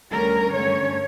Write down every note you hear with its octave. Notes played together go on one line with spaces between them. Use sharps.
D2 D3 G3 C#4 A#4
G2 D3 A3 C#4 C#5